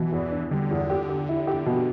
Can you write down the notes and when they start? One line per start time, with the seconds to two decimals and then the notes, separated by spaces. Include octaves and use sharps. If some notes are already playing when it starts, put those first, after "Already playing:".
Already playing: B2 E3
0.12 E2
0.32 D4
0.51 D3 G3
0.71 E2
0.90 G4
1.09 G4
1.29 E4
1.47 G4
1.66 B2